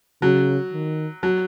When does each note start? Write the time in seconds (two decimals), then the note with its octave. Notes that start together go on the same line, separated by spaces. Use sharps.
0.22 C#3 F#3
0.73 D#3
1.23 F#3